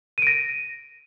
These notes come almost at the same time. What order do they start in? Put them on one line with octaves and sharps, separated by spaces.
D#7 D7 A#6